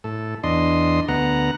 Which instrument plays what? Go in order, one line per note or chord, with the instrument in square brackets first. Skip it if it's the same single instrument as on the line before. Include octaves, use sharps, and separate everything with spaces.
[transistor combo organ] A2 A4
E2 D4 D#5 C6
D2 B3 F#5 A#5